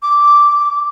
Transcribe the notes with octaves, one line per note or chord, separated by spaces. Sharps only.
D6